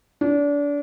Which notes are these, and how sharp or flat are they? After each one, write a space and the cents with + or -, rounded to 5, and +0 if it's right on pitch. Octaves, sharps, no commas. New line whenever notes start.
D4 -30